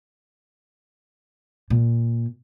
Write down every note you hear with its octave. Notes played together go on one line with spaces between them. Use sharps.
A#2